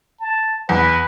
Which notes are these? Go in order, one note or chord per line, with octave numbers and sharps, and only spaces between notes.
A5
E2 B4